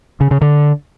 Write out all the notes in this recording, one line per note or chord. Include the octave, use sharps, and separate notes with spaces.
C#3
C#3
D3